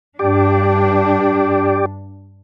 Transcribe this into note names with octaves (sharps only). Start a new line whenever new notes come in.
G2 D4 G4 D5